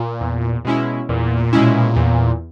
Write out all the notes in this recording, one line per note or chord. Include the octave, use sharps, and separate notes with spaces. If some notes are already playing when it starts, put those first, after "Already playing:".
Already playing: A#2
E2
B2 G#3 C#4 E4
E2 A#2
B2 G#3 C#4 E4
E2